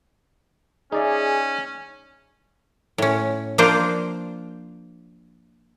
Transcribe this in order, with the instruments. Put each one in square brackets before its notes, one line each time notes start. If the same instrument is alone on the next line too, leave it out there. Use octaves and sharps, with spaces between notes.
[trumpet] C#4 [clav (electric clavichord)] D#4 D5 E5 [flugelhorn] G#4
[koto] A2 C#4
F3 A#3 D4 F4 C5